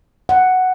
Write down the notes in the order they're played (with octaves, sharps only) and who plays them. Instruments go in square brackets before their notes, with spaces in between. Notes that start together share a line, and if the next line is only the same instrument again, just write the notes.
[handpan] F#5